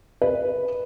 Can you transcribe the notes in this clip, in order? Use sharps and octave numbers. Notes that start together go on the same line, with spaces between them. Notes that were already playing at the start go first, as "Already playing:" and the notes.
B4